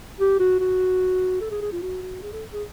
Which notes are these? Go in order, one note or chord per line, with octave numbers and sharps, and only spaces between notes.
G4
F#4
F#4
A4
G#4
G#4
F4
F#4
F#4
G#4
A4
G#4